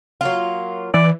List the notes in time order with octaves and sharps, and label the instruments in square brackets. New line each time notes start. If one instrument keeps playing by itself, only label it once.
[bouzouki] F#3 A#3 F4
[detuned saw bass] E3 [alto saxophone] D5